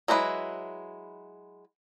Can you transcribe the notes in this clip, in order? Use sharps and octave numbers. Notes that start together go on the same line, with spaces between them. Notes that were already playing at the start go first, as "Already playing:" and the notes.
F#3 G#3 E4 F#4 B4